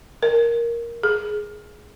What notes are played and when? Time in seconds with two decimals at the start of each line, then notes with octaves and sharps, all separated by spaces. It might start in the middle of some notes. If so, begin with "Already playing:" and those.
0.23 A#4
1.03 G#4